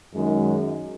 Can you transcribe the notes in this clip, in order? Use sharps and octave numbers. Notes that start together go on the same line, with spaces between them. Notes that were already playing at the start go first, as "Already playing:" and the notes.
F#2 D#3 G#3